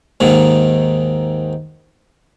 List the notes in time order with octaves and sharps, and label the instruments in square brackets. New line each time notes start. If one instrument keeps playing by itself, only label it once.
[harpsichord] D#2 G#2 D#3